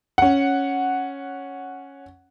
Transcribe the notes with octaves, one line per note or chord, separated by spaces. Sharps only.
C#4 F#5